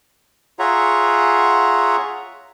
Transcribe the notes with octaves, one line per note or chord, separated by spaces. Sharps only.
F4 G#4 C#5 E5 F#5 A#5